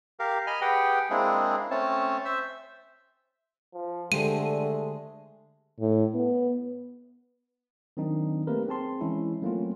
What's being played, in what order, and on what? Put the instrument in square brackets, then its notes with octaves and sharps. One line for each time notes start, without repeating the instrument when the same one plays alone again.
[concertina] G4 A#4 F5
D#5 G#5 B5 F6
G4 G#4 B4 F#5 G5
G#3 A#3 C4 D4 E4 G#4
A3 C4 C#4 C#5 A5
C5 E5 E6
[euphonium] F3
[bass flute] D3 [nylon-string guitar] G#3 G4 C5 [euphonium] A3 [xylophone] D#7
[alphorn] A2
B3
[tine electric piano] D#3 F#3 C4 D4 D#4
A3 A#3 C4 G4 A#4 B4
C4 G#4 A5 C6
E3 G#3 C#4 E4
F#3 A3 A#3 C4 C#4 F4